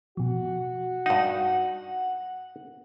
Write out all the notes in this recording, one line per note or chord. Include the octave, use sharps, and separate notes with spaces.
B2 F3 F#4
G2 D#4 F#5